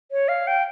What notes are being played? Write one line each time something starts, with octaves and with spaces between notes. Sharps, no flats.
C#5
F5
G5